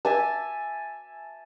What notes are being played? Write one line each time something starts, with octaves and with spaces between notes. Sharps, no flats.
E5 G#5 A5